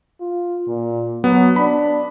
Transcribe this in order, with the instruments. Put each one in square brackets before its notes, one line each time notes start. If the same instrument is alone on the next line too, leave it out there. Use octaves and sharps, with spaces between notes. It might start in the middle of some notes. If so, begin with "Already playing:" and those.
[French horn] F4
A#2
[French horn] F#3 [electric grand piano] B3
[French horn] D4 [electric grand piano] B5